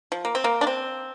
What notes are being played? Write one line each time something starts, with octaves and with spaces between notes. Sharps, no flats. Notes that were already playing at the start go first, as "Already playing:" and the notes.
F3
A#3
C4
A#3
D4
C4